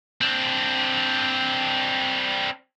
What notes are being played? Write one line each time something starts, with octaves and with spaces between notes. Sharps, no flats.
C4 D4